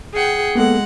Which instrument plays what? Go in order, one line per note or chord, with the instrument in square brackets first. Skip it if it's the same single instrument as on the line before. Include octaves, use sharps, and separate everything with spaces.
[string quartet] G#4 F#5 G5
[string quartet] G#3 F#5 [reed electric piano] A#3 B3 A4